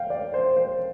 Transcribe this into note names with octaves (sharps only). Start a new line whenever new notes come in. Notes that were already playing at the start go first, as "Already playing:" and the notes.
Already playing: F5 G5
D5
C5
C5